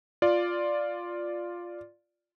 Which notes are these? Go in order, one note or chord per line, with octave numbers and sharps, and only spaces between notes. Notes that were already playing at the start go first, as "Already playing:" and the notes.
F4 D5